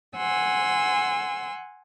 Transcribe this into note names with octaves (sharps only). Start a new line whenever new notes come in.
F#5 G#5 C6 E6